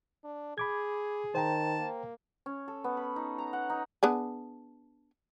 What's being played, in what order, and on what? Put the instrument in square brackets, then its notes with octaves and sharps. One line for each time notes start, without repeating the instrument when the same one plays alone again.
[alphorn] D4
[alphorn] G#4 [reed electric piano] B5 D6 G#6
[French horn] D#3 [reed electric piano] C5 G5 A#5 [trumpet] A5
[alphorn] A#3
[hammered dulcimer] C#4
A4
B3
B5
D#4
A#5
F#5
D#4
[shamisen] B3 D4 G#4